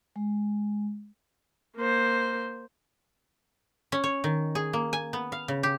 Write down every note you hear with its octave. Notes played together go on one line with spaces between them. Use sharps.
G#3
A#3 C5
C#4
C#5
D#3
G#4
A#3
G#5
B3
F5
C#3
G4